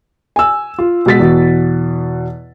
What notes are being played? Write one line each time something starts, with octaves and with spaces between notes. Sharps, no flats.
G#5 E6
F4
B2 G#3 A6 B6
E2 B2